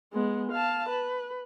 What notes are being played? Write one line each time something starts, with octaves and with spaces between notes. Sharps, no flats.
G#3 B3
F5 A5
B4